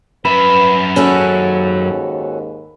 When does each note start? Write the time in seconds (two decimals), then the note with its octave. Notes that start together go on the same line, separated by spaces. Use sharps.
0.25 F#2 B4 E5 B5
0.96 D#2 G#2 D#3 C#4 F#4 A4